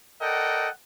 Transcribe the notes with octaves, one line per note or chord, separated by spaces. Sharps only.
A4 A#4 D5 D#5 F#5 G5